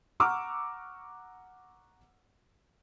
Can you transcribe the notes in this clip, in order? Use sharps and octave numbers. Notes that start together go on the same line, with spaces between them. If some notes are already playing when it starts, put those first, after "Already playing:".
F#5 A#5 C#6 D6 E6 F6